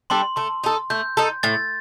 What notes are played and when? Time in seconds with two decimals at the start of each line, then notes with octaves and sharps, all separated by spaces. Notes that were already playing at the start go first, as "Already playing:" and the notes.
0.10 G3 D4 A4 C6
0.36 A3 C6
0.64 D#4 A4
0.90 A3 G6
1.17 D#4 A4
1.43 A2 A6